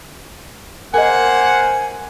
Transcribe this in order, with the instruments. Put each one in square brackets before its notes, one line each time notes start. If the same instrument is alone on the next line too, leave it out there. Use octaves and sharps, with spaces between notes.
[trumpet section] A#3 C5 F#5 [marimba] A#4 D#5 [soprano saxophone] G#5